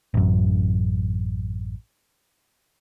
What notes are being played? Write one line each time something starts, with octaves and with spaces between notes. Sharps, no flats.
A1 F#2